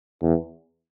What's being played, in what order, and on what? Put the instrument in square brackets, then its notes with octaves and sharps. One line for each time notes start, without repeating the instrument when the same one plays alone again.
[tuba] E2